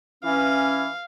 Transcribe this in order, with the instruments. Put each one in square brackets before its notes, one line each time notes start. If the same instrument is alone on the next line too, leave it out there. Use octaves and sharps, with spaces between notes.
[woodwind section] E3 C#4 [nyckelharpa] F5